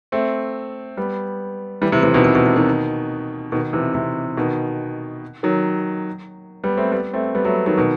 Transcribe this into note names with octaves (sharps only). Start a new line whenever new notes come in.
A3 C4
G3 B3
E3 G3
C3 E3
C3 E3
B2 D#3
C3
B2
C3
B2 D#3
B2 D#3
C3 E3
C3
B2 D#3
D#3 F#3
G3 B3
A3 C4
G3 B3
A3 C4
G3 B3
F#3 A3
D#3 F#3
B2 D#3